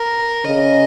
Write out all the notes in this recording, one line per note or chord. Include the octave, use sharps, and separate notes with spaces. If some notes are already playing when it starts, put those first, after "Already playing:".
Already playing: A#4
C#3 D#5